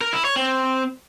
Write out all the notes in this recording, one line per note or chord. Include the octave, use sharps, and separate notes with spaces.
A#4
E4
C#5
C4